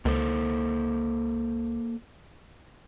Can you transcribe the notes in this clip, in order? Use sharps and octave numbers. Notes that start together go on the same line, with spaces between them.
C#2 A#3 A4 C5